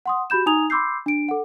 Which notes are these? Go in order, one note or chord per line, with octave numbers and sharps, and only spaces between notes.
F#5 C6 D#6
F#4 G4 B5 G6 E7
D#4 G#5 A#5 D#6 G#6 F7
B5 C6 D6 E6 G6 C7
D4 D7
A4 F#5